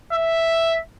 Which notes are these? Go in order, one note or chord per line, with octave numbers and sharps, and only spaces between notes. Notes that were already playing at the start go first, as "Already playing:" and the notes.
E5